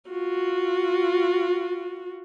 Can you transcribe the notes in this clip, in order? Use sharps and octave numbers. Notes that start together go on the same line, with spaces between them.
F4 F#4